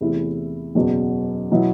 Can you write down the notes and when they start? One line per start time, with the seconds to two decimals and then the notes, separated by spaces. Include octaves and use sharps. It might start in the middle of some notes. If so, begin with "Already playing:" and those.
0.01 E2 C3 E3 A3 E4
0.75 F#1 E2 B2 F#3
1.52 B2 F#3 B3 E4